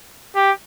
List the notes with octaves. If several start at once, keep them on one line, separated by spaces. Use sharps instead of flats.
G4